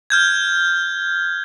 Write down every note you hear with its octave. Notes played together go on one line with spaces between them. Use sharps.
F6 G6 G#6